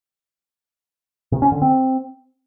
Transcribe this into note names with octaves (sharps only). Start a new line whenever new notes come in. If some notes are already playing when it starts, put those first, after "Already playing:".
C3
C#4
D3
C4